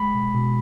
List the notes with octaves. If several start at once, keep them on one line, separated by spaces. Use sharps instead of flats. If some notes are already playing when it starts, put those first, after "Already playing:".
Already playing: G#3 B5
B2
B2